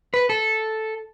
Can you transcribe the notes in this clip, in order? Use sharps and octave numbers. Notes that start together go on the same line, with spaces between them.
B4
A4